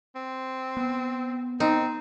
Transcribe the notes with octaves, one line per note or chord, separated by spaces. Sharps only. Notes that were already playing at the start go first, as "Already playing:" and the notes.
C4
B3
C4 D#4